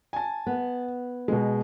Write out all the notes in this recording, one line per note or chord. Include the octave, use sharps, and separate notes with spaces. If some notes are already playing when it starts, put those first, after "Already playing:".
G#5 A5
B3
B2 G#3